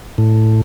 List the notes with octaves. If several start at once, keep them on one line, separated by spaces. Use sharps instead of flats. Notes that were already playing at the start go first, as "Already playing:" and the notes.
A2